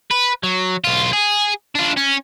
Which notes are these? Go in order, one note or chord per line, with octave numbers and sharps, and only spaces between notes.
B4
F#3
B1 F4
G#4
D4 F4
C#4